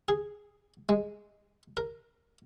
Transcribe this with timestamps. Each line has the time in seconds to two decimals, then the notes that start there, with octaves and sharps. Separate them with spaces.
0.08 G#4
0.89 G#3
1.77 A#4